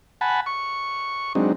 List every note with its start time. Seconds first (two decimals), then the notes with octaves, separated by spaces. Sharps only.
0.21 F#5 G#5 A5 B5
0.46 C#6
1.35 F#3 G#3 C4 D4 D#4